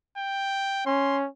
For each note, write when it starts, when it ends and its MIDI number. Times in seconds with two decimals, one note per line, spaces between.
0.18 0.84 79
0.86 1.28 61
0.86 1.17 84